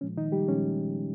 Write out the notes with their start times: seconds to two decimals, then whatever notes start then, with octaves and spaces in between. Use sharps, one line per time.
0.01 A#2 F3 G#3 C#4
0.17 D#3 D#4
0.32 G3 G4
0.48 A#2 F3 G#3 C#4